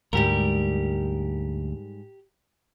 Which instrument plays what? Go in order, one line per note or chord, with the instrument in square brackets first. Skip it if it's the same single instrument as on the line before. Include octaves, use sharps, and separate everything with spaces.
[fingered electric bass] D2 [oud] G#2 G3 [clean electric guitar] G4 A#4